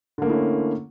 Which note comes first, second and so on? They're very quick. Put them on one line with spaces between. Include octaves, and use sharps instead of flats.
D3 A#3 A3 E4 C#4